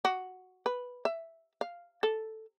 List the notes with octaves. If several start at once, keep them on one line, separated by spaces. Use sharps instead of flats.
F#4
B4
E5
F5
A4